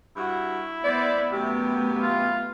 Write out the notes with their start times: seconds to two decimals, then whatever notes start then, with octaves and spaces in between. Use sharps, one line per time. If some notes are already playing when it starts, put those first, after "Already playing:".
0.17 G2 E4 F#4
0.83 B3 C5 D5 E5
1.32 F#2 C3 A3 B3 G4
2.02 F4